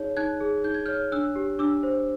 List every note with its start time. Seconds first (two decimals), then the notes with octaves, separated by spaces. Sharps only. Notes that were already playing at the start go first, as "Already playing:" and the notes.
Already playing: D#4 G#4 C#5
0.17 D#4 F#6 G#6
0.41 G#4
0.64 D#4 G6
0.74 G#6
0.86 C#5 F6 G6
1.12 D4 E6 F#6
1.36 G4
1.59 D4 D6 E6
1.83 C5